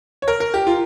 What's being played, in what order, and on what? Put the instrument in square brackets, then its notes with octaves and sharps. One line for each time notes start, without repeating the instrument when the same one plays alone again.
[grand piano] C#5
A#4
A#4
G4
F4